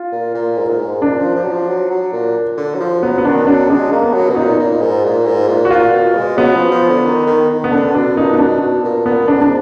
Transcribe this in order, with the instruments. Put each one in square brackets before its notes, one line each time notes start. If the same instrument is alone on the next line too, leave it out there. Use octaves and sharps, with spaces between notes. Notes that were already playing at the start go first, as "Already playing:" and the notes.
Already playing: [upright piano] F4
[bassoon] A#2
A#2
G#2
A#2
G#2
[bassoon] A#2 [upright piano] D4
[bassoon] F3
F3
F#3
F3
F#3
F#3
A#2
D3
F#3
F3
[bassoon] F#3 [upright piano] B3
[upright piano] B3
[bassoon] D#3 [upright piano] D4
[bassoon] F#3 [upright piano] D4
[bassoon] G#3 [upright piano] D4
[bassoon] A#3
[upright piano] B3
[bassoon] F#3
B2
[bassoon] A#2 [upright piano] D#4
[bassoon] A#2
G#2
A#2
G#2
A#2
[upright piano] F#4
[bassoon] A#2 [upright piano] F4
[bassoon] B2
G#3
[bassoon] F#3 [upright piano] B3
[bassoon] F3
F3
D3
D#3
D#3
D#3
[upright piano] B3
[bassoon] D3 [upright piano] D4
[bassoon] B2 [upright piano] D4
[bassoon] A#2 [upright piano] D#4
[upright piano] B3
[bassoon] B2 [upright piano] D4
[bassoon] B2
A#2
[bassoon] A#2 [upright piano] B3
[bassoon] G#2 [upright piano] D4
[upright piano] D4